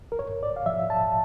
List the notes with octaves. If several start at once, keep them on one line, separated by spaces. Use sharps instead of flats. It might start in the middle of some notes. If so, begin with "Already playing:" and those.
A#4
G2 C#5
D5
F5
F3 E5
A5